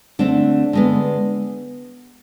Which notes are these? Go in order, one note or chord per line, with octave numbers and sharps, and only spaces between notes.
D3 A3 C4 D4
D3 G#3 B3